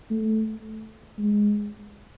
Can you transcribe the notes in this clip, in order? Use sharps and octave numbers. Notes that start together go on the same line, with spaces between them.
A3
G#3